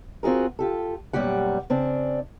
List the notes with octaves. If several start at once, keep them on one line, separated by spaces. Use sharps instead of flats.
C4 F4 F#4 G#4 A#4
F4 G4 A4
F#2 B2 G3 A#3 G4 F#5
C#3 C4 D4